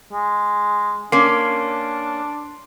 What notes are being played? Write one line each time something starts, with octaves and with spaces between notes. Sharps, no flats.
G#3
A#3 C#4 D4 C6 C7